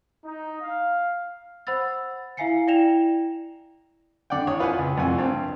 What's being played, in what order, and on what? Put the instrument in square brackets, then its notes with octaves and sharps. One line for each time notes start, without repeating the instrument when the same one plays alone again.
[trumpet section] D#4
F5
[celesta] C5 F#5 B5 E6 A6
E4 E5 F5 G#5 C7 C#7
E4 D5 G5 A#6 E7 F7
[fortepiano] D3 D5 F#5 G5
A1 C#5 D#6
F4 B4 C5 F#5 G#5
C#2
C2 F2 G#5
G2 C4